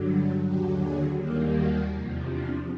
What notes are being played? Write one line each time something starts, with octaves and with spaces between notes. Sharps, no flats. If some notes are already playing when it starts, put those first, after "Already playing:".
Already playing: G2 D3 F#3
D#2 D3 F#3 G4
G#4
D#2 D#3 G3 A#3 G4
F#4
E2 C3 F3
D4